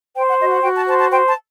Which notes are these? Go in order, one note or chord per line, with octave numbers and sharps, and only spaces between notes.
C5 G5
F#5
F#4 D#5
F#5
F#4 G5
A5
C5 A5
A5
C5 G5
A5